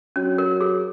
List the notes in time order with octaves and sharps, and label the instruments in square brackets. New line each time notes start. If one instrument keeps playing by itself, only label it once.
[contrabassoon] F#3 [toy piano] C#4
[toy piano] A#4
G#4